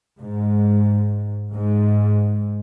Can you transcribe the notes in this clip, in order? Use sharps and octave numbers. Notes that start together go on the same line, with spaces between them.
G#2
G#2